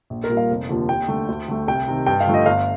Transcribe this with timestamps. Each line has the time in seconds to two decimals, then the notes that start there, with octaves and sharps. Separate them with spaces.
0.10 A#1
0.24 A#4
0.29 A#2 G3 A#3
0.37 F5
0.50 F1
0.69 D#2 D3 F3 A#3
0.89 D#2 G5
1.08 D3 A3
1.28 D2
1.48 D3 A3
1.68 C2 G5
1.88 C3 D#3
2.06 G2 G5
2.20 F5
2.27 D3 F3 A3
2.34 D#5
2.46 G1 F5